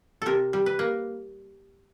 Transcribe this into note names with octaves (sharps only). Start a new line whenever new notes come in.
C3 A4 A#4
G3
B4
A#3